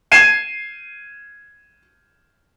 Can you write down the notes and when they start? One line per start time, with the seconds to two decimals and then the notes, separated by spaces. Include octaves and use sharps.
0.12 G#6 C7 D#7 E7